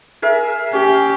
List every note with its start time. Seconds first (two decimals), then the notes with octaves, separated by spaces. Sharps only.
0.22 G#4 A#4 E5
0.73 C#4 G4